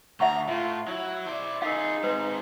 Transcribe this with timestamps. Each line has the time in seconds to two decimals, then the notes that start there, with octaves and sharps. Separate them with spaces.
0.20 D2 E5 F#5 A#5 C#6
0.48 A2 F4 E5
0.88 F#3 E4
1.26 C5 D5
1.62 D#4 F4 G#4 A#4 F5
2.04 G#3 C4 B4